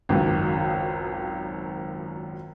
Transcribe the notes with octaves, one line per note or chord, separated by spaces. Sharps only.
G#1 C#2 F#2